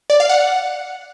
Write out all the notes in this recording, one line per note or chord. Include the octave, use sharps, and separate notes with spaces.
D5
F5
F#5